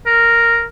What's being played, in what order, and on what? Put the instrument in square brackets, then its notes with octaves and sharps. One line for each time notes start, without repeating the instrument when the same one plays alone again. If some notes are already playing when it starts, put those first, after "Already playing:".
[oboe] A#4